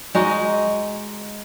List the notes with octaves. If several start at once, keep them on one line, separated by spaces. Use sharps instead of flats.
G#3 D#4 F#4